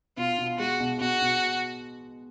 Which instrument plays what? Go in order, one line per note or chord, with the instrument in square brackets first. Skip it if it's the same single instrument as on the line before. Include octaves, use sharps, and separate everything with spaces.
[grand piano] B2 [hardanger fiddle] F4
[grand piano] B2
[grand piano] G#3 [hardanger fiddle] F#4
[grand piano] B2
[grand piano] B2 [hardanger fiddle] F#4
[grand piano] B2